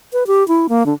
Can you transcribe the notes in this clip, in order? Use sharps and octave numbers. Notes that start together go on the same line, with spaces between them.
B4
G4
E4
A#3
D3